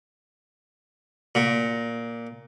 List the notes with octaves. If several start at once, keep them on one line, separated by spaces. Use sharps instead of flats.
A#2